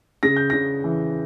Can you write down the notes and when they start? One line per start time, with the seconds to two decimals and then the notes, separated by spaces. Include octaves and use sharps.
0.23 C#3 A#6
0.37 G6
0.50 C#3 A#6
0.84 E3